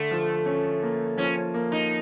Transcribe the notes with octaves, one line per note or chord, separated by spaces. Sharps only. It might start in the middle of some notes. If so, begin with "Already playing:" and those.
Already playing: D3 A3
F3
C#4
A#3
F3 C#4
A#3
D#4